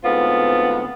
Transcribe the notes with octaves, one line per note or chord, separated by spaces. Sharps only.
D2 G#2 B3 C4 F4